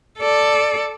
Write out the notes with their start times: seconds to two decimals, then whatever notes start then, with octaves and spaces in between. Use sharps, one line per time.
0.19 A4 D5